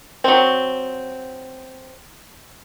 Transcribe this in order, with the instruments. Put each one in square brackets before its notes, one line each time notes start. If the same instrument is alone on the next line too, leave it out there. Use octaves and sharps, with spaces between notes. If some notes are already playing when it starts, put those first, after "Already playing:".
[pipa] F#3 C4